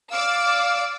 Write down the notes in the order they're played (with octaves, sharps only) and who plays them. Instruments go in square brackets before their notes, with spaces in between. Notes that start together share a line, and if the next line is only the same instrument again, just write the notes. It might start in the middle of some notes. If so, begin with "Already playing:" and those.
[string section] D5 D6 E6 [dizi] F5